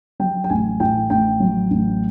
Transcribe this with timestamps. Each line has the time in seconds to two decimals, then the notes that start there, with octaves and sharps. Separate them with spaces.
0.20 F#3 G5
0.44 G5
0.50 A1 G#5
0.80 A2 G5
1.10 A1 G5
1.40 F#3
1.70 A1